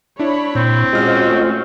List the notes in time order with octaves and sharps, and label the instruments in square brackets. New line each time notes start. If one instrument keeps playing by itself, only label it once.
[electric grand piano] D4 E4 [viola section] C#5 B5
[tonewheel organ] A#2 [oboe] C4
[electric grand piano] G#3 F6 [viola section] C#4 F#4 [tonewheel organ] F4 C5 D#5
[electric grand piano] A3